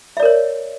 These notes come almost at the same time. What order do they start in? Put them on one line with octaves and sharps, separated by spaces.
E5 D5 A#4 C#5